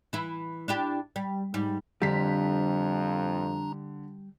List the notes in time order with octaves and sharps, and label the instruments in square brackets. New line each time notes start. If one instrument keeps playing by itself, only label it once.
[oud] E3 E4
D4 E4 G4
G3
G#2 G3
[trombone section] F2 [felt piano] D3 B6 [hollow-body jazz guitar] G3 [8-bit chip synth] D4 A#5